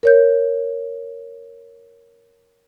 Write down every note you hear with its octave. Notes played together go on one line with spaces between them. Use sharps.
A#4 C#5 G6